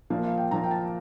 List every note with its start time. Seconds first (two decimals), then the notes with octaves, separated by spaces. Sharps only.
0.10 A#2 F3 A#3 F5
0.24 F5
0.38 G5
0.51 A#2 F3 A#3 A#5
0.63 G5
0.71 A5